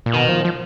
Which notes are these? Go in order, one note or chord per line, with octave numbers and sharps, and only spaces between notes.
A#2
B2 D#3
F3
F3